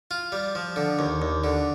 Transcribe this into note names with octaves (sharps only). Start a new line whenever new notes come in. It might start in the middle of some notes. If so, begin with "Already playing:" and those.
F4
G3
F3
D3
D#2
D#2
D3